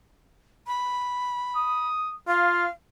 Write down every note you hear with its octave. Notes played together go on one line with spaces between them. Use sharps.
B5
D#6
F4 F5